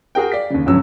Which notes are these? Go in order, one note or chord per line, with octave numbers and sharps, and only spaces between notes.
F#4 G#4 A#4 G5
D5 F5 B6
D#2 C#3
G1 C#2 C#3 F3 F#3 E6